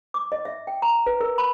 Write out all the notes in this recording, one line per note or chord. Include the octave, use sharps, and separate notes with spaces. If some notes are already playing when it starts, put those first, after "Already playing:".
D6
D#5
E5
G5
A#5
B4
A#4
B5